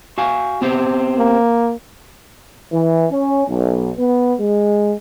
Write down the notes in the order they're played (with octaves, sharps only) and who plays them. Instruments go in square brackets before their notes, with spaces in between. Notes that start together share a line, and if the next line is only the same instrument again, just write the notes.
[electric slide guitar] F#4 F5 G#5
B3 C4 G4
[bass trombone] A#3
[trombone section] E3
C#4
B1
B3
G#3